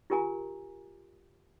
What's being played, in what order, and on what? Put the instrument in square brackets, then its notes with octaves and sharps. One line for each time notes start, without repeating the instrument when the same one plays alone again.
[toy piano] F4 G4 A#4 G#5 A#5